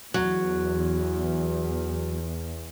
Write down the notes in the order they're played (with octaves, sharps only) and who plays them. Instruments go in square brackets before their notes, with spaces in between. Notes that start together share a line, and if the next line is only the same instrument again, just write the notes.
[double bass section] E2 [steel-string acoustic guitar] F#3